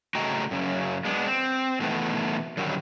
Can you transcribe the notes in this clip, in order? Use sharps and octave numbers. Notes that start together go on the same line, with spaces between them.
C#3 A3 F#4 D#5 G5 A#5
F#2 C#3 F#3
G#3 B3 D4
C4
B2 D#3 E3 A3 B3
F#2 D3 D#3 F#3 G3